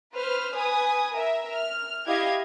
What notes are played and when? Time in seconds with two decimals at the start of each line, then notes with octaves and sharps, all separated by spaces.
0.14 B4 C5 F6
0.56 B4 G#5 D#6
1.15 A#4 E5
1.52 F6
2.06 E4 G4 D#5 F5 G#6